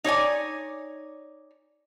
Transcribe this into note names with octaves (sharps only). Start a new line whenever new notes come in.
D#4 C#5 D5 G#5